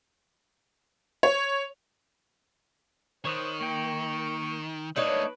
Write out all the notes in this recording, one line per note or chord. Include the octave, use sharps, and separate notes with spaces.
C#5
D#3 C5 C#5 D#6 F#6
A#3 G5 C#6
A3 A#3 D4 D#4 B4 C#5 D5